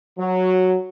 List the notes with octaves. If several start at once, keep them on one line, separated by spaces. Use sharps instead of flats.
F#3